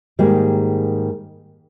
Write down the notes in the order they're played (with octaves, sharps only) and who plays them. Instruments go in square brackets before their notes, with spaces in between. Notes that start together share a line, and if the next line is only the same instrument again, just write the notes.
[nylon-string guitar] G#2 D#3 G3 A#3 G#4